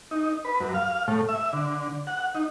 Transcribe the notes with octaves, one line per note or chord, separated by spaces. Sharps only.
D#4
B4
F#2
F5
A2
E5
D3
F#5
D#4